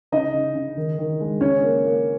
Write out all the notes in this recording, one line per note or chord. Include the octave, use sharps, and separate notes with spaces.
C#3 D#4 D#5
C#3
C#3
D#3
D#3
G#3
C#3 C#4 C#5
A#3
A#3